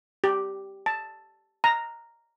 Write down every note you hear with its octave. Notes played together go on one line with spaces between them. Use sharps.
G4
A5
A#5